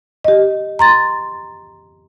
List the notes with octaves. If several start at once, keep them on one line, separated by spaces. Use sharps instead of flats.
G4 D#5
A#5 C6 A6